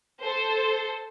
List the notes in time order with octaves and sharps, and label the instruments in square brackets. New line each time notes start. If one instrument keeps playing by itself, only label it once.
[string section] A4 C5